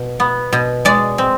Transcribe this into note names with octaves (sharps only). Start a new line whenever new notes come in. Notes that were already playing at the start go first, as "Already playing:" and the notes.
Already playing: B2
B3
B2
G#3 D5
C4